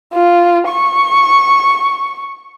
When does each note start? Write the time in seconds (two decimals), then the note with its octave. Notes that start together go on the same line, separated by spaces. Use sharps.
0.14 F4
0.68 C#6